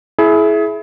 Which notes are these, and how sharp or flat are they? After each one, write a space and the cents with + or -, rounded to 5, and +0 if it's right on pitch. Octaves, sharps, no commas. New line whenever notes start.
E4 +0 G#4 +30